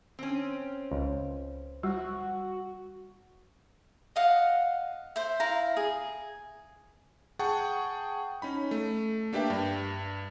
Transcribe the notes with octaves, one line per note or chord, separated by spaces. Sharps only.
C4 C#4
C#2
G3 F#4
D#5 F5 F#5
C5 E5
E4 F5 A#5
G#4
G#4 F#5 G5 A5 C#6
C#4 D#4 B5
A3
A#3 D4 G4 B4 E5 G5
G2